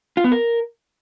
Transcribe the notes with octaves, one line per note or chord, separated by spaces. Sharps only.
F4
B3
A#4